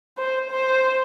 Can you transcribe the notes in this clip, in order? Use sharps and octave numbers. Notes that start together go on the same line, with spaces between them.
C5
C5